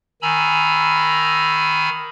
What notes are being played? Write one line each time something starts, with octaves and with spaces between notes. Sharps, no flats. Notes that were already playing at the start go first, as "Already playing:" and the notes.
D#3 G#5 A#5 B5 E6